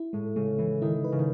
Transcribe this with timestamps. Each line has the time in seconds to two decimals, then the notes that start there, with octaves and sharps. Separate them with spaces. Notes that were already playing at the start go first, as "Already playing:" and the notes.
Already playing: E4
0.13 A2 G#3
0.36 C#3 G#3
0.59 E3 G#3
0.82 D#3 E4
1.04 B4
1.12 C#3
1.19 D#3